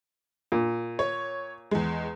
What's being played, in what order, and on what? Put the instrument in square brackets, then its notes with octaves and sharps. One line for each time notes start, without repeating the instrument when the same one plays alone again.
[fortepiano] A#2
[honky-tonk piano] C#5
E2 G#3